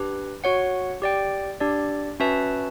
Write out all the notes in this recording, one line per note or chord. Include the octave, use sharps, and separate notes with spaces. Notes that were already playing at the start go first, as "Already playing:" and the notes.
Already playing: D4 G4 B4
F#4 C#5 F#5
G4 D5 G5
D4 G4 D5
C#4 F#4 B4 E5 A5